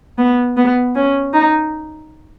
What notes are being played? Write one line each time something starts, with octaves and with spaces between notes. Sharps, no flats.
B3
B3
C#4
D#4